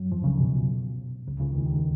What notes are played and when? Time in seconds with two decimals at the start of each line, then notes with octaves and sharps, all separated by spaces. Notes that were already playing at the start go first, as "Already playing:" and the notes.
Already playing: F#2 F#3
0.12 F2 F3
0.24 C#2 C#3
0.37 B2
1.27 C#2 C#3
1.40 C#2 C#3
1.53 D#2 D#3
1.66 D#2 D#3